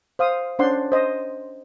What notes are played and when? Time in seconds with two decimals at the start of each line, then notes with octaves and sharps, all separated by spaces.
0.19 C5 F5 D#6
0.59 C#4 D4 C5 D5 F#5 C6
0.92 C5 D#5